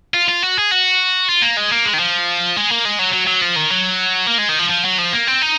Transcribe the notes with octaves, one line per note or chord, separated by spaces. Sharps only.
F4
F4
F#4
G#4
F#4
F4
A#3
G#3
A#3
G#3
D#3
F3
G#3
A#3
G#3
F#3
F#3
F#3
F3
D#3
F#3
A#3
G#3
D#3
F3
F3
F#3
F3
A#3
C4
D#4